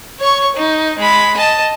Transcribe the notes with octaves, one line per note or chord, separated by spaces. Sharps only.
C#5 C#6
D#4
G#3 B5
D#5 A5